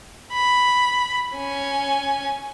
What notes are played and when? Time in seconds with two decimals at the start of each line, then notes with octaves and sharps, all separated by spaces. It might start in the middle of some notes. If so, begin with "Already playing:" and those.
0.33 B5
1.36 C#4 G#5